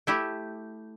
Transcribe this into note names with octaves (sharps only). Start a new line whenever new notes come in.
A3 E4 G4